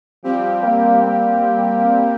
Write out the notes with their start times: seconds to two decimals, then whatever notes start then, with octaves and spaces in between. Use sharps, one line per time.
0.23 F3 G3 C4 G4
0.63 A#3
1.03 A#3